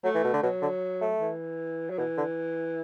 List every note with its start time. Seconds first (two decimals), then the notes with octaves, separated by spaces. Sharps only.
0.04 F#3 A3
0.15 E3
0.24 B2
0.33 D3
0.43 B2 F#3
0.62 D3
1.01 A3
1.21 E3
1.90 F#3
1.98 B2 E3
2.17 D3